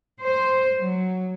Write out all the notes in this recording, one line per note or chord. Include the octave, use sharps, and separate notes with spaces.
C5
F#3